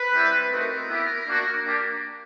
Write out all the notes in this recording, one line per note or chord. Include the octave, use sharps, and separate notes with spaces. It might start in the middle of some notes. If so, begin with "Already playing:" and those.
Already playing: B4
G3 C4 E4
A3 C4 D#4 F#4 A#4
B3 E4 G4
A#3 D4 F#4
A#3 D4 G4